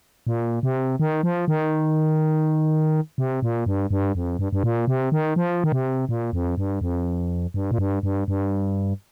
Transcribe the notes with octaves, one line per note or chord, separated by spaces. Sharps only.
A#2
C3
D#3
F3
D#3
C3
A#2
G2
G2
F2
G2
G2
A#2
C3
D#3
F3
D#3
C3
A#2
F2
G2
F2
G2
A#2
G2
G2
G2